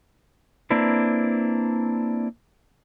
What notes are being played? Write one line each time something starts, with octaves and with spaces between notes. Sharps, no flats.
A#3 C4 D4 E4 B4